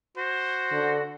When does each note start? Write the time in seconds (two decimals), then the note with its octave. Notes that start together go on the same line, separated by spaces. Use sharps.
0.17 F#4 C5
0.71 D3